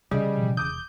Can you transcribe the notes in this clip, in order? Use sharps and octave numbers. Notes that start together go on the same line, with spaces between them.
C#3 E3 G3 G#4 D#5
A1 B2 F3
E1 D6 D#6 G6